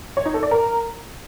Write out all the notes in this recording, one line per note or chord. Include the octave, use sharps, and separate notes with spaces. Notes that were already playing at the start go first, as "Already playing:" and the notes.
C#5
D#4
A4
D5
A#4